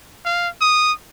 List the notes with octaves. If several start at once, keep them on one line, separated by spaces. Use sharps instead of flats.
F5
D#6